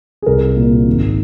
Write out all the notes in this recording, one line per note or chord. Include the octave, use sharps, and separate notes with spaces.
G#4
C2 A#4
A#2
G#1